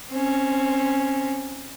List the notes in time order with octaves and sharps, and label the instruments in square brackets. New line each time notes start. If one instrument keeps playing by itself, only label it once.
[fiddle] C4 C#4